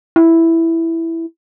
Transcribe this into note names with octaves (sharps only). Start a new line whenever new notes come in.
E4